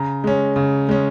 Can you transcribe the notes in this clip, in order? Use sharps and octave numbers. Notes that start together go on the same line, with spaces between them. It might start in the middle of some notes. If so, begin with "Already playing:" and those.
Already playing: C#3 A#5
G#3 C#4
C#3
G#3 C#4